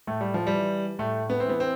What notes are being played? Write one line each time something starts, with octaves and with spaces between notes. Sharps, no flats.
A2 A3
G3
F3
G3
E3
A2 A3
B3
C4
E3 B3
C4